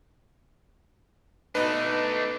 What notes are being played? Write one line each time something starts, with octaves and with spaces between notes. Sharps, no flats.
B2 A3 D4 D#4 B4